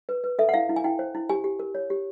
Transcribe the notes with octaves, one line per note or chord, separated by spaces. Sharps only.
B4
B4
A4 E5
F#5
E4 F5
E4
G#5
E4 G5
C5
E4
G4 G#5
G4
A#4
C#5
G4